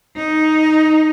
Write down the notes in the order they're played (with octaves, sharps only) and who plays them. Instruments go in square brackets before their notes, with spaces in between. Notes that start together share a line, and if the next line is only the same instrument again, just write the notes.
[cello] D#4